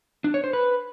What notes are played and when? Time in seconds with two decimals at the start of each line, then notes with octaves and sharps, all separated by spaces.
0.24 D4
0.34 C#5
0.44 C5
0.53 B4